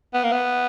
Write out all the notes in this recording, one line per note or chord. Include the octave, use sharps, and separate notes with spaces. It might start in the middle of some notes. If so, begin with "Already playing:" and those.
B3
A#3
B3